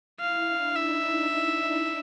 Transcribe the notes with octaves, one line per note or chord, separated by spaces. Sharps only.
E4 F5
D4
D#4 E5